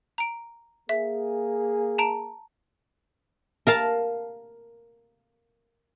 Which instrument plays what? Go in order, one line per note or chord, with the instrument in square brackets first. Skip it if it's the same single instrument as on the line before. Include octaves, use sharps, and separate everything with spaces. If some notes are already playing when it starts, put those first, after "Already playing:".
[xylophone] A#5 D7
[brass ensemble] A#3 G#4 [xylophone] E5
[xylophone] A5 A#5 D7
[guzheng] A#4 F5 A5